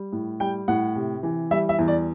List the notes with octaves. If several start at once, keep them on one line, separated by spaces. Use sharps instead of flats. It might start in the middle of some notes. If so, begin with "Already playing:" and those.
Already playing: G3
A2
G3 G5
A2 F#5
C3
E3
G3 E5
E5
E2
D5